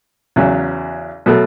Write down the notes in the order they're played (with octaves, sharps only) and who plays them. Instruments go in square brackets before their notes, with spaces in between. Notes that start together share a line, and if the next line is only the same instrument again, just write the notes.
[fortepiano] E2 C#3 F#3
B2 F#3 A3